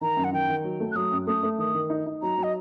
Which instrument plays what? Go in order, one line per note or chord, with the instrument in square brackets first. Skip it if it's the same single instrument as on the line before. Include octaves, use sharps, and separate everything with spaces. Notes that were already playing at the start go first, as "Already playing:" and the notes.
[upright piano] D#3 [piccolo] A#5
[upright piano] F#2
[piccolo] F#5
[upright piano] D#3 [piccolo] G5
[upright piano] D#3
F#3
A3
[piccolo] F#6
[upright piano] F#3 [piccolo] D#6
[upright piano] F#2
[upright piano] A3 [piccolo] D#6
[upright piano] A3
[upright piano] D#3 [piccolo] D#6
[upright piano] D#3
D#4
D#4
[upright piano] F#3 [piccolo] A#5
[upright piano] F#3
[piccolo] D#5